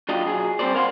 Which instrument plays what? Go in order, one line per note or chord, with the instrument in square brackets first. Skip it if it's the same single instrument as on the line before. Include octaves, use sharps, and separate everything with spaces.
[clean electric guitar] F#3 D4 F4 G4 D#5
B1 F#3 G#4
G3 C4 G4 A#4 C5 D5
A#4 C#5 F5 F#5 A#5 C6